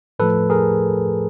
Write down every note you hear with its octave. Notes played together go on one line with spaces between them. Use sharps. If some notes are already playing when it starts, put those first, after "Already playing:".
A2 F3 A3 A4 B4
G#4 A#4